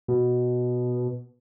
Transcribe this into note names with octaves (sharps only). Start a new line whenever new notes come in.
B2